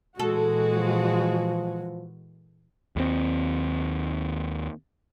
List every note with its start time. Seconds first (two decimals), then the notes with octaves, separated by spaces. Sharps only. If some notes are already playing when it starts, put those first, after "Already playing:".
0.19 A#2 E3 G#3 F#4 A4
0.74 F3
2.96 D#2 G3 C4